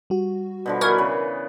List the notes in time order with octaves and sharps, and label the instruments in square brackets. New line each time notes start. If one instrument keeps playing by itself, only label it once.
[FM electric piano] G3 F#4
[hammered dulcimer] B2 D3 F3
[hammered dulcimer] E3 B3 [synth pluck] A#4 C#6 G#6
[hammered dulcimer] C#3